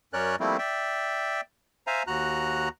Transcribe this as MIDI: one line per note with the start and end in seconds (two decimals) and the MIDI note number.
0.13 0.36 42
0.13 0.36 61
0.13 0.36 70
0.13 0.36 73
0.13 0.36 74
0.13 0.36 90
0.40 0.57 53
0.40 0.57 55
0.40 0.57 57
0.40 0.57 58
0.40 0.57 60
0.40 0.57 64
0.59 1.41 74
0.59 1.41 76
0.59 1.41 79
1.87 2.03 72
1.87 2.03 76
1.87 2.03 77
1.87 2.03 80
1.87 2.03 82
2.07 2.69 39
2.07 2.69 66
2.07 2.69 82
2.07 2.69 90